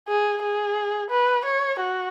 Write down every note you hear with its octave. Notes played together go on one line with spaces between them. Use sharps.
G#4
G#4
B4
C#5
F#4